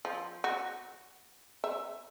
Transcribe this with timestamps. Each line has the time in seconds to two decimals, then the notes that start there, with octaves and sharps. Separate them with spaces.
0.05 F3
0.44 F#4
1.64 E5